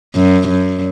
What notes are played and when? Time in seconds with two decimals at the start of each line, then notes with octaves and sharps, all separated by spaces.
0.15 F#2
0.48 F#2